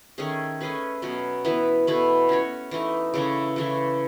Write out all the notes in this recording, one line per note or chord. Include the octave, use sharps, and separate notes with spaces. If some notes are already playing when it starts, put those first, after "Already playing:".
D#3 A3 C#4 G#4
A3 C#4 G#4 B4
B2 F#3 C#4
E3 B3 E4 B4
B2 A3 E4 B4
C#4 F#4 C#5
E3 A3 D#4
C#3 E3 A3
C#3 E3 A3